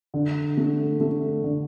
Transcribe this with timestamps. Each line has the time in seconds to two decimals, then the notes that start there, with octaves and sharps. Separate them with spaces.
0.14 D3
0.57 A3
1.00 A3
1.44 D3